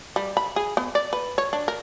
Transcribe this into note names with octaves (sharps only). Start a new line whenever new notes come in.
G3
B5
G#4
B3
D5
B4
C#5
D4
A#4